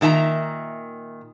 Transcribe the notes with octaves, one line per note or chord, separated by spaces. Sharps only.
A#2 D#3 E5 G#5 A#5